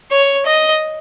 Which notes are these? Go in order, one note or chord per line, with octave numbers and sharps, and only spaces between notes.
C#5
D#5